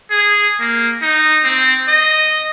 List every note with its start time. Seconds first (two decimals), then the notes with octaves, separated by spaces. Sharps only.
0.11 G#4
0.60 A#3
1.02 D#4
1.44 C4
1.89 D#5